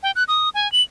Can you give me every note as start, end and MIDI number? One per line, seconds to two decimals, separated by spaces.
0.03 0.11 79
0.16 0.24 90
0.28 0.49 87
0.54 0.70 80
0.72 0.83 102